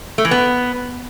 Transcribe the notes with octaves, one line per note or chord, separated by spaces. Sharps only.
A3
E3
B3